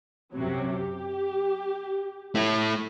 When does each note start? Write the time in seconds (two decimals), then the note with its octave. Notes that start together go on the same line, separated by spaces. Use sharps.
0.34 F#2 C3 F#3
0.75 G4
2.35 A3 E4